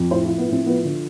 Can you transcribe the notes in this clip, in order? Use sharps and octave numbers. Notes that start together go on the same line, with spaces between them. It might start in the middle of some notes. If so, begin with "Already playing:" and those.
Already playing: F2
A2 C5
F4
F3
B3
A2 C4
F3 B3
D3